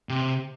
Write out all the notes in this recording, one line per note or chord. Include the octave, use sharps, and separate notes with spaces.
C3